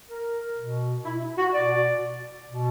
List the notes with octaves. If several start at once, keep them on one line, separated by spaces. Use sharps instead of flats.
A#4
B2
E4
F#4
B2 D5
B2